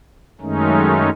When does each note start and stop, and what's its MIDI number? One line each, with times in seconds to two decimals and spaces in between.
0.41 1.09 42
0.41 1.09 51
0.41 1.09 56
0.41 1.09 57
0.41 1.09 61
0.41 1.09 63